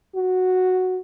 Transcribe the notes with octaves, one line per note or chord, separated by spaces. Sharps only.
F#4